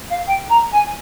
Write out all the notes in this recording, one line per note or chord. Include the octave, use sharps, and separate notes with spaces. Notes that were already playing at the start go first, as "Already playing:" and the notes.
F5
G5
A#5
G#5